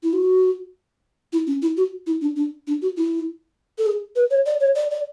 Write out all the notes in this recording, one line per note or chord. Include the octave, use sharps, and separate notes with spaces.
E4
F#4
E4
C#4
E4
F#4
E4
D4
D4
D4
F#4
E4
A4
G#4
B4
C#5
D5
C#5
D5
D5